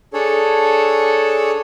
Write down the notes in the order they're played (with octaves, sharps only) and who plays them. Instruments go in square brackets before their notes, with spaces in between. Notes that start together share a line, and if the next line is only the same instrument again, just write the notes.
[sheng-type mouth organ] D4 G#4 A4 C#5